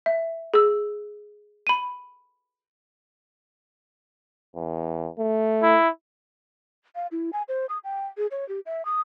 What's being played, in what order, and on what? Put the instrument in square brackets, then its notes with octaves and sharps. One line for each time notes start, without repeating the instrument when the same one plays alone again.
[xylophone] E5
G#4 E6
B5 D#7
[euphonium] E2
A3
[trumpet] E4
[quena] F5
E4
G#5
C5
D#6
G5
G#4
C#5
G4
E5
D#6